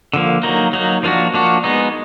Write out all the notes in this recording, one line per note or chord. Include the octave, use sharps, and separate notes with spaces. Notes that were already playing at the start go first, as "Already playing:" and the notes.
D3 F3 A#3
F#3 A#3 D#4
F#3 A#3 D#4
F3 A#3 D4 F#4
F3 A#3 D4 F#4
G#3 B3 D#4